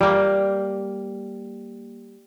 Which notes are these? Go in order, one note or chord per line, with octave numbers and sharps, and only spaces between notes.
G3 A#3